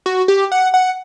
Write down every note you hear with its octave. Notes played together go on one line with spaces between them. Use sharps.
F#4
G4
F#5
F#5